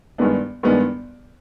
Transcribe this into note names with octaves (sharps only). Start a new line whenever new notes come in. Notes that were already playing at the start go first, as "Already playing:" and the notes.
G2 D#3 G#3 B3 D4
G2 D#3 G#3 B3 D4